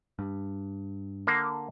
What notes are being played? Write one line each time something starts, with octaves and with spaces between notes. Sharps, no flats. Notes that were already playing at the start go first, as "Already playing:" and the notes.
G2
D3 A#3